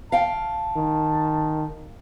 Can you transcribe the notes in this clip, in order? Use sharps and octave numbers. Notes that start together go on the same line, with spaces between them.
F5 G5 A5
D#3